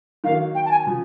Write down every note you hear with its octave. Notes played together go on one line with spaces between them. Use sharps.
D#3 F#3 A#3 F5
G5
A5
G#5
C#3 F3